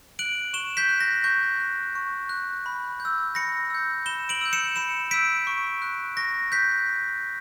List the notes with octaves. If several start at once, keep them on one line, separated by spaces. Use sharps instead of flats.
F#6 D7 F#7
C#6 E7 G7
G6 B6
F#6
A#6
C#6 G6
F#6
C#6
F#6
B5
G6
E6
B5 A#6 C#7
E6 G6
B5 E7 G7
D7 F#7
E6 G6
C#7 E7
B5 C#7 E7
E6 G6 B6 D7
C#6
F#6
C#6 A#6
F#6 G6 B6